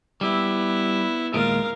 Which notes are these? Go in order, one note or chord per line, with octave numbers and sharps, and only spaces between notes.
G3 B3 E4
D#2 A#2 G#3 A#4 F5